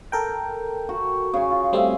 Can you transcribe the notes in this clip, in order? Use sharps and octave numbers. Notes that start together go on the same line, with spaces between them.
A4 A#4 G5
F#4
C#3 G#5
F4
G3 A3 C4 E5 G#5 C6